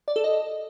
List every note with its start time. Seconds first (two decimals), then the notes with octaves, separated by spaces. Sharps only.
0.08 D5
0.16 A4
0.24 D#5